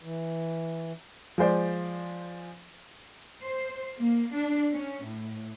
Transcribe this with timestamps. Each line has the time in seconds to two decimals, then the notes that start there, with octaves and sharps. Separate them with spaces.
0.02 E3
1.38 F3 G#3 C5 D5
3.43 C5
3.98 A#3
4.33 D4
4.74 C#4
5.05 A2